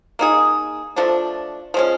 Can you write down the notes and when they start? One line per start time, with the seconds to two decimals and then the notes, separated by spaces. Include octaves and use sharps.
0.19 A#3 D#4 G#4
0.96 F3 A3 D4
1.74 F3 G#3 C#4